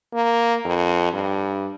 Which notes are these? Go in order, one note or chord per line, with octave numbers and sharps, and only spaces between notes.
A#3
F2
G2